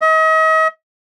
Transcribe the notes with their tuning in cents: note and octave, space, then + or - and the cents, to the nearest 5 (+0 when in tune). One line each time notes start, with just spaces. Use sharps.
D#5 +40